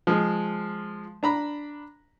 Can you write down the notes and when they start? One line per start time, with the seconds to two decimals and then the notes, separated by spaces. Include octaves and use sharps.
0.07 F3 G#3
1.23 D4 A#5 B5